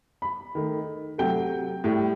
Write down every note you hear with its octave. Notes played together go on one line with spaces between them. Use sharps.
B5
D#3 A3
C3 F#3 A3 G5
A2 G3